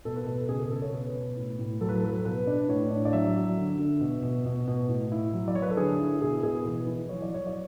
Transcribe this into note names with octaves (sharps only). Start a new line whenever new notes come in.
B2 A4
B4
B2 A4
A4
C#3 G#4
A4
C#3 A4
C#5
B2 B4
B2
A2
A2
F#3 A4
B4
A4
F#3 B4
A4
B2 B4
D4
A2 C#5
D4
D5
F#3 E5
F#3
D3
D3
B2
B2
B2
B2
A2
E4
F#3
D5
F#3 C#5
B4
A4
D3 G#4
E4
B2 G#4
B2 G#4
E3 B4
E3
F#3 C#5
D5
F#3 C#5
D5